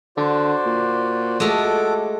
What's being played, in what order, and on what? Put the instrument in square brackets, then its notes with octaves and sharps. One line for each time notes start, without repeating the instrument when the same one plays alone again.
[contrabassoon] D3 [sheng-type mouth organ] F#4 C5 D5
[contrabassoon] A#2
[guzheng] G#3 A3 [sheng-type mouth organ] F#4 A4 D6